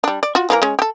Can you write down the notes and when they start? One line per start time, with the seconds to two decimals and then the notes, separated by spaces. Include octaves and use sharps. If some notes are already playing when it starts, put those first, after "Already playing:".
0.04 G3 D4
0.23 D5
0.35 F4 F#4
0.50 E3 A#3 A#4
0.62 G#3 C#4
0.79 G4 A4